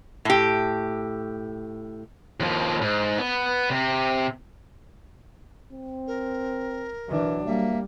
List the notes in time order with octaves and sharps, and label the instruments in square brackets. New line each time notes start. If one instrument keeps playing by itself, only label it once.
[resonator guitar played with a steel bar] A2 G4
[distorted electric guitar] D#2 F3
G#2
B3
C3
[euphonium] C4
[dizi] A#4
[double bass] E3 D4 [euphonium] F#3
[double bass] G3 [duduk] A#3 [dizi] E5